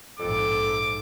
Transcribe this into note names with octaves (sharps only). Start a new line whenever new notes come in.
A#1 F2 G#2 A4 D6